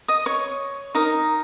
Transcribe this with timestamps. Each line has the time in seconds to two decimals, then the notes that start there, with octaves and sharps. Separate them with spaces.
0.08 D#5 D#6
0.26 C#5 C#6
0.95 D#4 A#4 D#5